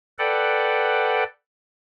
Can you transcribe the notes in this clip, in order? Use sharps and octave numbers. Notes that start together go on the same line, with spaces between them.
A4 B4 D5 F#5 G5